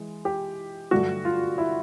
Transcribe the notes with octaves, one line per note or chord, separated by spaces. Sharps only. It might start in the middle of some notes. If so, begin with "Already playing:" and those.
Already playing: E3 G#3
G4
G2 D3 F#3 A3 F#4
F4
E4